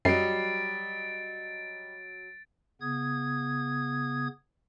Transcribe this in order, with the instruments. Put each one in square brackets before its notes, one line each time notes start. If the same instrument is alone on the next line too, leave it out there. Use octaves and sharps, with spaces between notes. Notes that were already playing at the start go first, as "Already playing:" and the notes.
[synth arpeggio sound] F#2 [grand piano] F#3 C7 [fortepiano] G3 D#5 [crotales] A6 D7
[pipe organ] C#3 B3 D#6 G#6